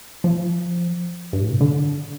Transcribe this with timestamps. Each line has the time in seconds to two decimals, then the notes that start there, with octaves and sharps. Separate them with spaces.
0.24 F3
1.33 G2
1.42 A2
1.51 C3
1.61 D3